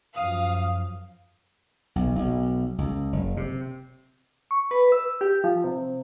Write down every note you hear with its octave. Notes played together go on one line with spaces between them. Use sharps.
F#2 F3 F5 D#6
B1
B1
C#2
F#1
C3
C#6
B4
E6
G4
F3
C3